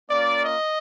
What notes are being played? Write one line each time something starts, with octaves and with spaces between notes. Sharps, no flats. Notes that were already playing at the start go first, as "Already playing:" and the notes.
A#3 C#4 F4 D5
D#5